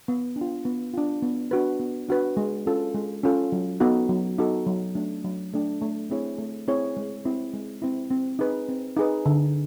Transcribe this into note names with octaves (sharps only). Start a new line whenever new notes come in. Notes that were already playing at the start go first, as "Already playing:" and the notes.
B3
D4
F4
B3
D4 F4
B3
D4 F#4 B4
B3
D4 F#4 B4
G#3
C#4 F4 A4
G#3
C#4 F4 A4
F#3
B3 D#4 F#4 A4
F#3
B3 D#4 F#4 A4
F#3
A3 D4
F#3
A3 D4
A3
C4 E4 G#4 C#5
A3
C4 E4 G#4 C#5
G#3
C4 E4
G#3
C4 E4
C4
D#4 G#4 B4
C4
D#4 G#4 B4
D3